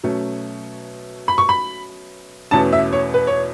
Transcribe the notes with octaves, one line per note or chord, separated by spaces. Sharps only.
B2 F#3 A3 C#4
B5
C#6
B5
E2 B2 A3 C#4 A5
E5
C#5
B4
C#5